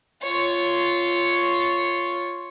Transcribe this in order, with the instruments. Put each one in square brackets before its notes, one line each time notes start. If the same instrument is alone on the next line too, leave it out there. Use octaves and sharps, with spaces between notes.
[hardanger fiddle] F4 C#5